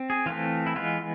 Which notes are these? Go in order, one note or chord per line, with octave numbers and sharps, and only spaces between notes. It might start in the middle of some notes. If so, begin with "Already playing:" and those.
Already playing: C4
G#4
E3 A3 C4 F4
E4
E3 G#3 B3 F4